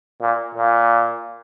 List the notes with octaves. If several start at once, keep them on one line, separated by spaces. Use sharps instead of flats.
A#2
A#2